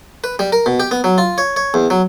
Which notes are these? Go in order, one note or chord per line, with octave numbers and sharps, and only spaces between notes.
B4
G3
A#4
B2
G4
B3
F#3
F4
C#5
C#5
E2
F#3